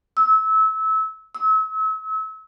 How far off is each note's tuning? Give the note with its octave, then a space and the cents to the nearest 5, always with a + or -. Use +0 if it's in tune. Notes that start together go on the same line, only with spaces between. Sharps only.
E6 -25
E6 -40